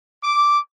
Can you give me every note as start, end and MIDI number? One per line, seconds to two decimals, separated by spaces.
0.23 0.59 86